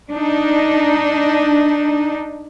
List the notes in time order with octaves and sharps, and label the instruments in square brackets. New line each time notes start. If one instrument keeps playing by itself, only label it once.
[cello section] D4 D#4